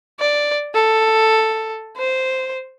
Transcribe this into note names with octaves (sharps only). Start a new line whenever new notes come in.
D5
A4
C5